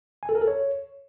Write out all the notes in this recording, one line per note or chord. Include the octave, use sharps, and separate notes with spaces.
G#5
A4
A#4
A4
C#5